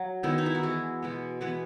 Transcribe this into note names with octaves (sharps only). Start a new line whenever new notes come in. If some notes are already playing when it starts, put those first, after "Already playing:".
Already playing: F#3
D#3 G#3 B3 E4
D#4
E4
F#4
E3 G#3 B3 G#4
B2 G#3 B3
E3 G#3 B3 B4